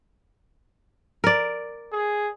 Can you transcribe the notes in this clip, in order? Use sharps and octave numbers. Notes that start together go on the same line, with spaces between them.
A#4 D5
G#4